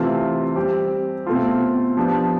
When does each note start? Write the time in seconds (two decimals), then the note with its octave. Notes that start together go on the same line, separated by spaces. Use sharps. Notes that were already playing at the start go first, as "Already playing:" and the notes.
Already playing: C3 E3 A3 C4 F4
0.56 G3 C4 G4
1.27 B2 A3 C4 F4
1.97 F3 B3 D4 G4